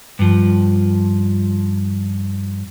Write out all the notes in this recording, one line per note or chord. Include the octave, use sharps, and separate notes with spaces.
G2 F3